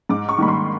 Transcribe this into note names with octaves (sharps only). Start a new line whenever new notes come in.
G#2 D6
C#6
D#3 G3 A#3 B5
C6